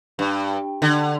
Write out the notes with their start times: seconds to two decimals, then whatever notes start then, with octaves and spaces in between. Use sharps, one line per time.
0.19 G2
0.82 D3